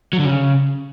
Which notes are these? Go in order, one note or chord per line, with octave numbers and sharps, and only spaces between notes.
F#3
D3
C#3